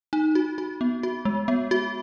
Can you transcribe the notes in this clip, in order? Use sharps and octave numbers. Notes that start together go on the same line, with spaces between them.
D#4
F#4
F#4
B3
F#4
G#3
B3
F#4